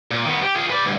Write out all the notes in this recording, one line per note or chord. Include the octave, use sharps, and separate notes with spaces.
A#2
D#3 B3
G4
F4 G#4
B4 D5
D2 G2